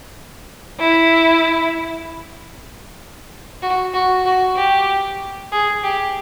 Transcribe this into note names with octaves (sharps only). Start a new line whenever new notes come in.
E4
F#4
F#4
F#4
G4
G#4
G4